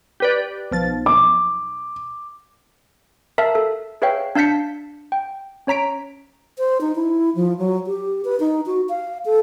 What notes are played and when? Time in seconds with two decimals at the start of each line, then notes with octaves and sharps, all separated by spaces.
0.20 G4 B4 D5
0.71 B1 F3 A6
1.06 D6
3.38 A#4 E5 F5 A5
3.55 A4
4.02 G#4 B4 C#5 E5 F5 G5
4.35 D4 F5 A5 G6 B6 C#7
5.12 G5
5.67 C#4 C#5 A#5 B6 D7
6.58 C5
6.81 D#4
6.95 E4
7.35 F3
7.58 F#3
7.87 G4
8.25 B4
8.40 D#4
8.66 F#4
8.89 F5
9.25 A4